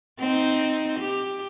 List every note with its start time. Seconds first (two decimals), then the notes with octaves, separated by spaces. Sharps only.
0.19 C4 D#4
0.99 G4